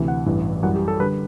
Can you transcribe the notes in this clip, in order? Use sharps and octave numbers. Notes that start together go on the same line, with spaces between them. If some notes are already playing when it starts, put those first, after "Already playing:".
Already playing: D2 C3 E3
F#5
A1 G2 E3
F#2 E3 G3 F#5
G4
A4
D3 G3 B4